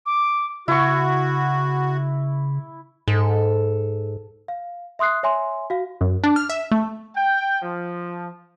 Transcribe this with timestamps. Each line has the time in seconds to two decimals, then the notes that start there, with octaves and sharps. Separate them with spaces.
0.06 D6
0.68 C#3 E4 F#4 C#6
3.08 G#2 A4
4.48 F5
4.99 E5 C6 D#6 F#6 C7
5.23 C#5 E5 G#5 C6
5.70 F#4 F5
6.01 F#2
6.24 D4
6.36 F6
6.49 E5
6.71 A3
7.16 G5
7.63 F3